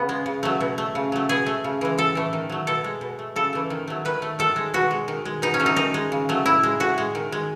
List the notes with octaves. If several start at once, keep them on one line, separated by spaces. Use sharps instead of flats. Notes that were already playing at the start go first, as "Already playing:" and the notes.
Already playing: C#3 B3
G#3
C#3
F#3 A3
B2
A3
C#3
F#3 A3
B2 G#4
A3
C#3
E3 G#3
A2 A4
E3 A3
D#3
F#3 A3
B2 A4
G#3
B2
A3
C#3 A4
E3 A3
D#3
F#3 A3
D#3 B4
A3
D#3 A4
G#3
B2 F#4
G#3
D#3
G#3
B2 D#4
C#4
F#3 A3
D#4
D#3 D#4
G#3
C#3
F#3 A3
A2 E4
G#3
A2 F#4
G#3
D#3
G#3